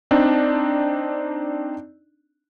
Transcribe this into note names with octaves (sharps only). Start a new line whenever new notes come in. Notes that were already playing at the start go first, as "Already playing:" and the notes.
C4 D4 D#4